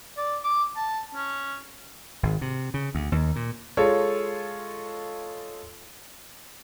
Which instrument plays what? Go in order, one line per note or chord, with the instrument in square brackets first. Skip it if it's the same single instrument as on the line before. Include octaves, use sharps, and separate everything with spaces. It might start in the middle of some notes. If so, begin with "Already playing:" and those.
[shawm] D5
D6
A5
C#4
[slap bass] G#1
C3
C#3
D2
D#2
A#2
[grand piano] G#3 F4 A4 C#5